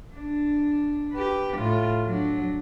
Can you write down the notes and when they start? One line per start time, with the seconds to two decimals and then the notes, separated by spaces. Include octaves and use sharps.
0.14 D4
1.13 G4 B4
1.57 A2 F4
2.04 F#3 D4